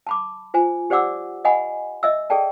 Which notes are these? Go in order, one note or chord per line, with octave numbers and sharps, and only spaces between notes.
A5 B5 D6
F4 C5 G#5
G4 C5 D5 F#5 D6 E6
D#5 F#5 G#5 B5
D#5 E5 E6
G#4 A4 D5 G5 A5